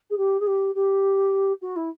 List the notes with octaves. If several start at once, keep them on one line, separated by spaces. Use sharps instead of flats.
G#4
G4
G#4
G4
G4
F#4
E4